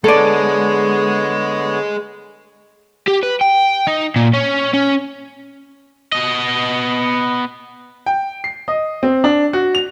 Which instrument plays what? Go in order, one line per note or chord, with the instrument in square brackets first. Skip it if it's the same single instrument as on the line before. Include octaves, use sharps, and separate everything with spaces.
[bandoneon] D3 B3 C#5 [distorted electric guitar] G#3 [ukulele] A4 D5
[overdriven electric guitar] G4
B4
G5
D#4
A#2
C#4
C#4
B3 D#5
[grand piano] G5
C7
D#5
C4
D4
F#4
F7